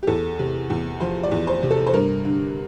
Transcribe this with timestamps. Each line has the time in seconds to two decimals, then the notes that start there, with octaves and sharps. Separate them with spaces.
0.03 G4
0.07 E2 A4
0.39 C3
0.70 E2
1.00 F3 C5
1.23 D5
1.31 E2
1.47 C5
1.63 C3
1.71 A4
1.87 C5
1.94 G2 A#4
2.25 D3